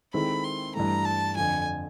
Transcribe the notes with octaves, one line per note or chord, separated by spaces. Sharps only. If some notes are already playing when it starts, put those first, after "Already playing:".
D#3 G#3 C4 E4 A4 B5
C6
G2 E3 A3 A#5
A5
F2 D3 F3 G#5